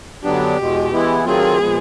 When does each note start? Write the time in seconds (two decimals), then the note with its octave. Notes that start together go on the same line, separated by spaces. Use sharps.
0.23 F#2 D3 F#3 B3 D4 G4
0.58 E2 B2 G#3
0.91 E3 G#3 B3 E4
1.25 D#3 F#3 A3 C4 F4 G#4
1.59 A#2 F3 G#3 B3